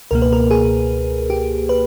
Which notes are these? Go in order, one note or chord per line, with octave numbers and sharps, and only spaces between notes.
C#2 B2 A#3 A#4
B4
A#4
G#4
G4
B4